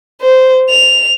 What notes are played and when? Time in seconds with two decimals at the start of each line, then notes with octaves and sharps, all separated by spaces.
0.22 C5
0.70 F7